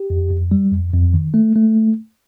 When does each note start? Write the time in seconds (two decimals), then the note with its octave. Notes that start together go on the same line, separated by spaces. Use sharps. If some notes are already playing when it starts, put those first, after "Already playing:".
Already playing: G4
0.10 F2
0.31 F2
0.51 G3
0.71 F2
0.93 F2
1.14 D#3
1.34 A3
1.56 A3